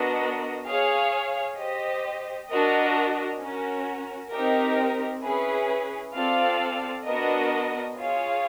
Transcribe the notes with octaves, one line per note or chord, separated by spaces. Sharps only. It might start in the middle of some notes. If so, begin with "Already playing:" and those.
Already playing: B3 D4 F#4 A#4 D#5
G#4 C#5 F5
G4 C5 D#5
D4 F#4 A#4 D#5
C#4 F#4 A#4
C4 D#4 G4 A#4
C#4 E4 G#4 B4
C4 F4 A4 D5 F5
B3 D4 F#4 A#4 D#5
F4 G#4 C#5 F5